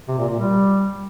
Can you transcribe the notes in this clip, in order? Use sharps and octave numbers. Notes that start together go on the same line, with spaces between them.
C3
A#2
A#2
G3